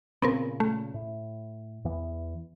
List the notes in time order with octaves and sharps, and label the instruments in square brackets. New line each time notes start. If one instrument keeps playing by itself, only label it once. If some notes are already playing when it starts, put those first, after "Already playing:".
[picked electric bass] A#2 C#3 [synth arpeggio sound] B3 C4 A#4
[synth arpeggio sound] A3
[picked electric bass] A2
E2 E3 B3